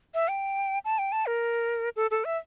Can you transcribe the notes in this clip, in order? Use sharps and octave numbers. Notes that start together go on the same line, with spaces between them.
E5
G5
A5
G5
A5
A#4
A4
A4
E5